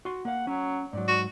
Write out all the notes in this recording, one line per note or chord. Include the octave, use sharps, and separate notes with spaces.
F#4 C6
A#3 F5 F#5
F#3 C#4
G#2 F#3 D5
F#4